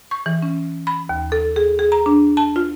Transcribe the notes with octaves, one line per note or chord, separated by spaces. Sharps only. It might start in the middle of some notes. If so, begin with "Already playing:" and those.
C#6
E3
C#4
B5
D#2
A4
G#4
G#4
A#5
D4
A5
F4